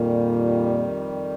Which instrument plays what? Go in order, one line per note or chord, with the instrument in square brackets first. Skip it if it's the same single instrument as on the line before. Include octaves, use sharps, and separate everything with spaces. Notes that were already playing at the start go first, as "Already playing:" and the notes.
Already playing: [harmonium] F2 D#3 G3 [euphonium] A#2